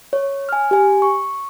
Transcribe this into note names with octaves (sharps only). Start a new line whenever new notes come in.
C#5
G#5 F6
G4 G#5
C#6